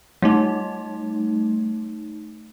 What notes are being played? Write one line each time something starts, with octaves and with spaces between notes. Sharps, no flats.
G3 A3 D#4